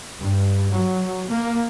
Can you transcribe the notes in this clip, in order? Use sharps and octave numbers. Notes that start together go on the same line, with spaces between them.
G2
F#3
A#3